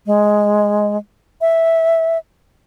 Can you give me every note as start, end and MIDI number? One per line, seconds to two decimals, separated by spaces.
0.06 0.97 56
1.41 2.18 76